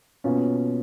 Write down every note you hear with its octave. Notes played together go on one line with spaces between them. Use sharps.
B2 A#3 C#4 F4